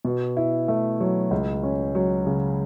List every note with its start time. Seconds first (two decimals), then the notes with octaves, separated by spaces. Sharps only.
0.05 B2
0.37 E4
0.68 A3
1.00 F#3
1.31 C#2
1.63 C#4
1.95 F#3
2.27 C#3